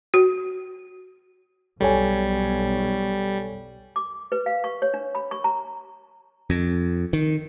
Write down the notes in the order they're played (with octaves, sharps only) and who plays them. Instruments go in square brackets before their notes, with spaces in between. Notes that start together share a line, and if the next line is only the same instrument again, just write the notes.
[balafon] F#4
[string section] B1 [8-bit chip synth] G3 [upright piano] A4 C#5 G#5
[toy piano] D6
B4
F5
C#6
C#5
D4
B5
C#6
A#5
[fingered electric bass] F2
D#3